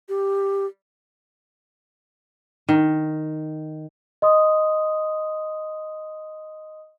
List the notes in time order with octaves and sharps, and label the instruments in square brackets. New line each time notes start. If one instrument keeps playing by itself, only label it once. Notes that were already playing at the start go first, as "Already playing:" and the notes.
[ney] G4
[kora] D#3
[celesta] D#5 C6 D#6